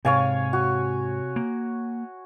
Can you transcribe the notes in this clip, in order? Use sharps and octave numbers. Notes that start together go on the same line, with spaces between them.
G#2 C3 C#5 F5 G#5
F#4
A#3